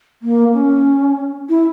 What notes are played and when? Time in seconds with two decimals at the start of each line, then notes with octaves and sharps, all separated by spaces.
0.22 A#3
0.53 C#4
1.49 E4